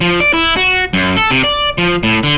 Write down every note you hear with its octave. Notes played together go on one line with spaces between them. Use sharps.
F3
D5
E4
F#4
F#2
A4
C3
D5
F3
A2
D3